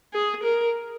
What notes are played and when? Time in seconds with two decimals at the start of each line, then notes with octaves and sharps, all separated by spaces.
0.14 G#4
0.43 A#4